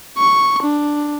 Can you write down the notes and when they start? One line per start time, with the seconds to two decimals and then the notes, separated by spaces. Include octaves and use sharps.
0.18 C#6
0.63 D4